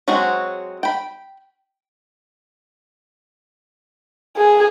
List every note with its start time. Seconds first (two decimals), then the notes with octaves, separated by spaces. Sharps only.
0.08 F#3 G#3 C4 F#4 G#4
0.83 G5 B5
4.37 G#4